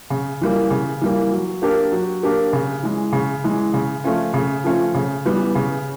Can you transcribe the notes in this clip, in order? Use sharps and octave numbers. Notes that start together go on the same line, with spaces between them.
C#3
E3 G3 A#3
C#3
E3 G3 A#3
F#3
A#3 D4 G4 A#4
F#3
A#3 D4 G4 A#4
C#3
E3 G#3
C#3
E3 G#3
C#3
F3 A3 C#4 F4
C#3
F3 A3 C#4 F4
C#3
E3 G3 B3
C#3